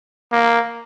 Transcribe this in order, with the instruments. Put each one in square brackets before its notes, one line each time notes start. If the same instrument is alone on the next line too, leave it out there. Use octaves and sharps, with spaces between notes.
[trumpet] A#3